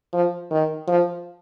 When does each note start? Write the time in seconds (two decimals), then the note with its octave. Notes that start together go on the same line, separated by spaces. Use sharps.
0.13 F3
0.51 D#3
0.88 F3